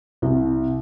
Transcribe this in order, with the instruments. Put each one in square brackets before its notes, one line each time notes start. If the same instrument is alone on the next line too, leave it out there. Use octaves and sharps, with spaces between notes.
[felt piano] C2